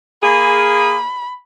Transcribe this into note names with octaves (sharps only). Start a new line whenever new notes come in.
A#3 G#4 B5